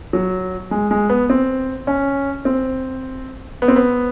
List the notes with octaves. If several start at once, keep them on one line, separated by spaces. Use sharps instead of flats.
F#3
G#3
G#3
B3
C4
C#4
C4
B3
C4
B3